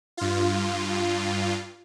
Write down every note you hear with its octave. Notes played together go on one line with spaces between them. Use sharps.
G2 F4